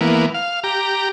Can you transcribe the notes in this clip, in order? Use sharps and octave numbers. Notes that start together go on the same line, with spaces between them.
E3 A#3 B3
F5
G4 A#5